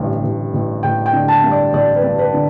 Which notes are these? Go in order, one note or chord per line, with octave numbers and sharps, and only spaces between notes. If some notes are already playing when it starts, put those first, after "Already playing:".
Already playing: A1 G2 D3
A1
A1
A1 G5
G5
D3
A5
G2
D5
A1 D5
B4
G2
B4
D3